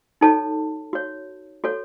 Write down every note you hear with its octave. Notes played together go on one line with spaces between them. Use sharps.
D#4 F#4 A4 C#5 A5
F#4 C#5
F#4 A4 C#5